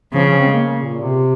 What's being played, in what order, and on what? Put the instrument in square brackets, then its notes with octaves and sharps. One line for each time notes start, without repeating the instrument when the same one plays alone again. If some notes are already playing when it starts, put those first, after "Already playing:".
[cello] C#3 [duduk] F3
[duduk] C#4
C4
G#3
A#3
C#3
A#2
C3